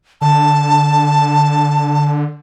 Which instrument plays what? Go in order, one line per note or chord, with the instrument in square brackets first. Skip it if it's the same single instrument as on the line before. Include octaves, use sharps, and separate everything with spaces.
[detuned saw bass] D3 [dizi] A5